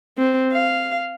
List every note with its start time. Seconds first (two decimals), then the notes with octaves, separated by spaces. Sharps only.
0.18 C4
0.52 F5